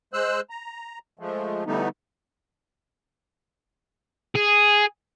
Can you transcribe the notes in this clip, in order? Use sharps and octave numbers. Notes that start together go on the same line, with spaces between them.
G#3 C5 E6 F#6
A#5
F3 G#3 A3
D3 E3 G3 A3 B3 D#4
G#4